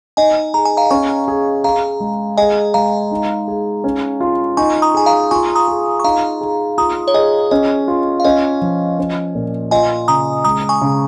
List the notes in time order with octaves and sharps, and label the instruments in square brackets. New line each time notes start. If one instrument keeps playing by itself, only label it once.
[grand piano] D#4 [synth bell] D#5 G#5
[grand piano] G#4 [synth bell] A#5
[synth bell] G#5
F5 A#5
[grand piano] C#4 [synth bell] G#5 C#6
[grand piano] G#4
[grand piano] G#4 [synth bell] F5 A#5
[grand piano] G#3
[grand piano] G#4 [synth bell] D#5 G#5
[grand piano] G#3 [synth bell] F5 A#5
[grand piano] D#4
G#4
C#4
F4
[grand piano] D#4 [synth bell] G#5 C#6
[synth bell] A#5 D#6
[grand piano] G#4 [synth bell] G#5
[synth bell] F5 A#5
[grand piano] F4 [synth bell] G#5 C#6
[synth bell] A#5 D#6
[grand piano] G#4
[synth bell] C#6
[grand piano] D#4 [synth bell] F5 A#5
[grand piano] G#4
[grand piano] F4 [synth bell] A#5 D#6
[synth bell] C#5
[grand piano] G#4 [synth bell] D#5
[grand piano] C#4 [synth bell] D#5
[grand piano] F4
[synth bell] F5
[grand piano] C#4 [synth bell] D#5
[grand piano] F3
C#4
A#2
[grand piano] F4 [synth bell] D#5 G#5
[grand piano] C#3 [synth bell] A#5 D#6
[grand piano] G#3 [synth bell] A#5 D#6
[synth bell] G#5 C#6
[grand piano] C#3